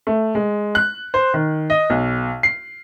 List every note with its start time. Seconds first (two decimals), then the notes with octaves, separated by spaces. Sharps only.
0.07 A3
0.35 G#3
0.75 F#6
1.14 C5
1.34 D#3
1.70 D#5
1.90 B1
2.43 C7